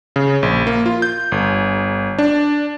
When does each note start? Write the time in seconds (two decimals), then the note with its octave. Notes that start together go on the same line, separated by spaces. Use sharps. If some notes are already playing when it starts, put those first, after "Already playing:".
0.16 C#3
0.43 A#1
0.67 A#3
0.86 F4
1.02 G6
1.32 G1
2.18 D4